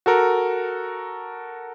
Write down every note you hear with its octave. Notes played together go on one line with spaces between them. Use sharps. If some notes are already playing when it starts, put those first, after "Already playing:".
F#4 A4 A#4